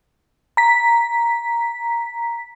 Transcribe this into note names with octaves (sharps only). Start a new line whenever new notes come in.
A#5 B6